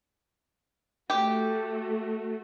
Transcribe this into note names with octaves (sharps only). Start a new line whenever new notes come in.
A3 F#4 G4